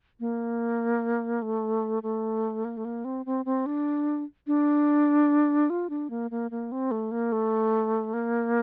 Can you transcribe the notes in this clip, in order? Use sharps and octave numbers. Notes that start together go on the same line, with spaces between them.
A#3
A3
A3
A#3
A3
A#3
C4
C4
C4
D4
D4
F4
D4
A#3
A#3
A#3
C4
A3
A#3
A3
A#3